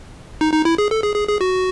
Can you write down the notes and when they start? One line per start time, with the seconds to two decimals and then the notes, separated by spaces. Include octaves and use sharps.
0.41 D#4
0.53 D#4
0.65 E4
0.78 G#4
0.91 A4
1.03 G#4
1.16 G#4
1.28 G#4
1.41 F#4